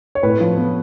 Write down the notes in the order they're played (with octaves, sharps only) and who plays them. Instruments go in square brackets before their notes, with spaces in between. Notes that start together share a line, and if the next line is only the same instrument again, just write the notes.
[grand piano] C#5
[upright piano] A2 [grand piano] B4
[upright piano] F3
B3